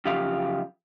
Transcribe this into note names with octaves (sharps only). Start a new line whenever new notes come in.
F#2 C#3 F3 G4 F5